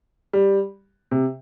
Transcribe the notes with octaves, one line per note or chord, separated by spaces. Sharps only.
G3
C3